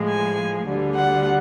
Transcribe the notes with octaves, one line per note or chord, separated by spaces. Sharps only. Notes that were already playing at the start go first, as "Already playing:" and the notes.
Already playing: A2 F3 G#3
G#5
D2 D3 G3
F#5